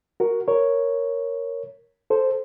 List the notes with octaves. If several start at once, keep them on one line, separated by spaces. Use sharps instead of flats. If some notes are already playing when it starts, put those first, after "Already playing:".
F#4 A#4
A#4 C#5
A4 C5